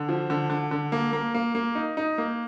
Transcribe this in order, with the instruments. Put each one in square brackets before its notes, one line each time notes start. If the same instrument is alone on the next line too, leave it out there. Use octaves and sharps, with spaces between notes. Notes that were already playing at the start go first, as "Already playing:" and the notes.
Already playing: [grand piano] D3
F3
D3
D3
D3
A#3
A#3
A#3
A#3
D#4
D#4
A#3